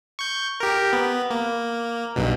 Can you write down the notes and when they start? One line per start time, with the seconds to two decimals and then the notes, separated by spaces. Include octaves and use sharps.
0.19 C#6 G6
0.60 G4 A#4
0.93 B3
1.31 A#3
2.16 B1 G2 B2